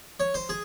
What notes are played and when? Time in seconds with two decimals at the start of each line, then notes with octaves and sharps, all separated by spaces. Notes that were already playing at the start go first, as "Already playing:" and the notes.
0.20 C#5
0.34 C5
0.49 G#4